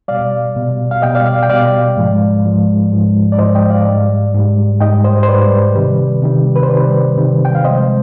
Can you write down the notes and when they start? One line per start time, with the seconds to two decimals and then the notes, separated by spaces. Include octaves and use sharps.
0.08 B2 G3 D5 F5
0.56 B2 G3
0.91 F5
1.02 B2 G3 D#5 G5
1.15 D5 F5
1.26 D5 F5
1.43 G5
1.49 B2 G3 D5 F5
1.97 G#2 F3 G#3
2.45 G#2 F3 G#3
2.92 G#2 F3 G#3
3.32 D5
3.39 G#2 F3 G#3 C5 D#5
3.54 D#5 G5
3.70 D5 F5
3.86 G#2 G3
4.34 G#2 G3
4.81 G#2 G3 D#5 G5
5.04 C5 D#5
5.23 C5
5.29 G#2 G3 B4 D5
5.75 C3 D#3 G3
6.22 C3 D#3 G3
6.56 B4
6.63 C5
6.70 C3 D#3 G3 B4 D5
7.17 C3 D#3 G3
7.45 G5
7.55 F5
7.64 C3 F3 G#3 C5 D#5